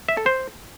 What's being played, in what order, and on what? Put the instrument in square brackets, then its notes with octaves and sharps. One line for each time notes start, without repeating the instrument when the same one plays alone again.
[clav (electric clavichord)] E5
A4
C5